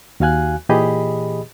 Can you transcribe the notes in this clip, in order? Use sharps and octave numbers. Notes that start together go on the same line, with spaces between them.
D#2 F#4 F5 G#5 F#6
A#2 E3 G4 G#4 D#5 B5